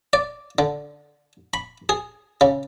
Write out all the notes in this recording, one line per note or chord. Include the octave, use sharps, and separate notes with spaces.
D5
D3
B5
G#4
C#3